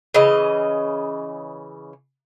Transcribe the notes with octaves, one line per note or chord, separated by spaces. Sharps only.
C#3 E3 D#5